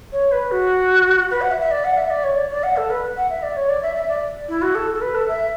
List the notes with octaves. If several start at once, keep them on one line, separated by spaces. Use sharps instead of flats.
C#5
B4
F#4
B4
F#5
E5
E5
D5
F#5
E5
D5
C#5
D5
D5
F#5
A4
B4
F#5
E5
D5
C#5
D5
E5
E5
D5
E4
F#4
A4
A4
B4
A4
E5